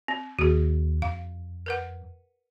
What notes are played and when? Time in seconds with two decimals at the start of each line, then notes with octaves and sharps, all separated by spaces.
0.08 C4
0.39 D#2 F#4 G#4
1.02 F2 F5
1.66 A#4 B4 F#5